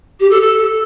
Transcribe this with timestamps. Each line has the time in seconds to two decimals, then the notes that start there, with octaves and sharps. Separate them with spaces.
0.20 G4
0.30 A4
0.40 A4